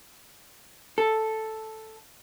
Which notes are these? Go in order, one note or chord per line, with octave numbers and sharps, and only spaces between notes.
A4